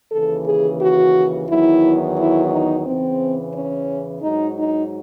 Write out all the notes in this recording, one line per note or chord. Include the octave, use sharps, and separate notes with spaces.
D#2 C#3 E3 A4
G#4
F#4
E2 D#3 F#3 E4
E4
D#4
E2 C#3 E3 C4
C#4
G#2 F#3 D#4
D#4